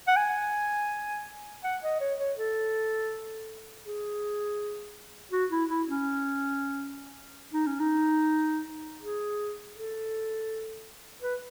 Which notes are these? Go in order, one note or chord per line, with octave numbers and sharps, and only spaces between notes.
F#5
G#5
F#5
D#5
C#5
C#5
A4
G#4
F#4
E4
E4
C#4
D#4
C#4
D#4
G#4
A4
B4